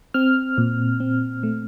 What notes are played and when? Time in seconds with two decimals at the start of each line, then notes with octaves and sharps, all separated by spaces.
0.14 C4 F6
0.58 A#2
1.00 C4
1.43 A3